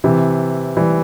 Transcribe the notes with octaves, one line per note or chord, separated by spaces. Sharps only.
C3 E3
E3 G3